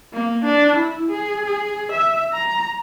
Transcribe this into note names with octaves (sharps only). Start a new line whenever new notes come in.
A#3
D4
E4
G#4
G#4
E5
A#5